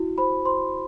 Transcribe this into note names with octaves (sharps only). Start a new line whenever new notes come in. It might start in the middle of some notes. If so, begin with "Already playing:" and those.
Already playing: E4 F#4
C5 B5
C5 C6